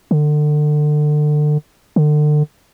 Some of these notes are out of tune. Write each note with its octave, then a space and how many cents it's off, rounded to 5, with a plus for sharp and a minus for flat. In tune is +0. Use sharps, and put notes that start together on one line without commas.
D3 +30
D3 +35